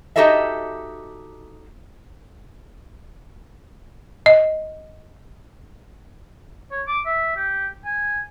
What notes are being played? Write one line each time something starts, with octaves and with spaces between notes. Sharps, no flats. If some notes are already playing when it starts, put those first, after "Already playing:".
D#4 F#4 G4 A4 D#5 E5
D#5
C#5
D6
E5
G4
G#5